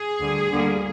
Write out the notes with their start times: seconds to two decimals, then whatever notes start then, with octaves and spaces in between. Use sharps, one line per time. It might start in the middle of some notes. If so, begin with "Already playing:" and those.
Already playing: G#4
0.21 D2 D3 G3
0.52 D2 D3 G3 A#3